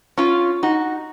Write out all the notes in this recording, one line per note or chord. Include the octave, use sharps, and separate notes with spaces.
C#4 F4
D#4 F#4